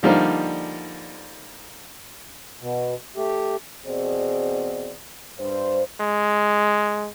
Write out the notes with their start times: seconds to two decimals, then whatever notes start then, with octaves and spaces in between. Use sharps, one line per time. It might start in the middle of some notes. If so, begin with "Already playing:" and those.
0.03 D3 F3 G3 A#3 D#4
2.61 B2
3.16 A3 G4
3.85 E2 B2 C4 G#4 D5
5.39 G2 C5
6.01 G#3